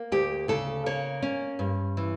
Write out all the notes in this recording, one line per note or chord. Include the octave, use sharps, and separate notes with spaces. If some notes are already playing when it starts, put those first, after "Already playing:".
Already playing: A#3
D2 G4
C#3 A4
A#3 C#5
C#4
G2
E3